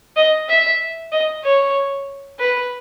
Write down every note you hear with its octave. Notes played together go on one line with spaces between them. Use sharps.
D#5
E5
D#5
C#5
B4